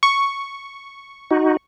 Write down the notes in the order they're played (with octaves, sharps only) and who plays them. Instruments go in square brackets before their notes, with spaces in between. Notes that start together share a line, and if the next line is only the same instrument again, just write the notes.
[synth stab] C#6
[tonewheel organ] D#4 F#4